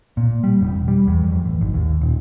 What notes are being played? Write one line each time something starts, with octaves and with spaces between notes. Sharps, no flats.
A#2
G3
F1
E1
G3
E2
F2
A1
G#1
D#2
D#1